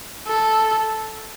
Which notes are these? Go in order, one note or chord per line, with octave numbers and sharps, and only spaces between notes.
A4